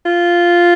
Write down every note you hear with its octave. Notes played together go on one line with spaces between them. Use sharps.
F4